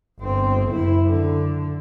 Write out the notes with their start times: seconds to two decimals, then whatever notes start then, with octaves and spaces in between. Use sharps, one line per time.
0.19 G1 C4
0.69 F#1 E4
1.06 D3